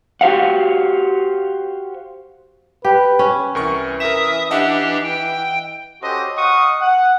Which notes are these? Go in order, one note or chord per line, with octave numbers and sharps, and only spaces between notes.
F#4 G4 C5 F5 F#5
G4 B4
C#4
C2 E3 A#4 C#6
A#4 E5 D#6 E7
D4 G4 D#5 E5 F#5
G5
C#4 F#4 G4 A4 C5 D#5
D#5 F5 F#5 C#6 D#6
F#5